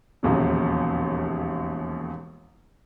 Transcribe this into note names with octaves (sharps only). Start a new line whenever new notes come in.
E1 A#1 D#2 C#3